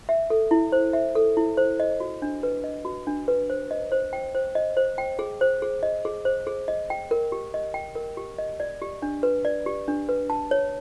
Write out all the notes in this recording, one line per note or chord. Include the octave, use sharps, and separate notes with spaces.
E5
A4
E4
C5
E5
A4
E4
C5
D#5
F#4
D4
B4
D#5
F#4
D4
B4
C5
D#5
C5
G5
C5
D#5
C5
G5
G#4
C5
G#4
D#5
G#4
C5
G#4
D#5
G5
A#4
G4
D#5
G5
A#4
G4
D#5
D5
G4
D4
B4
D5
G4
D4
B4
A5
C#5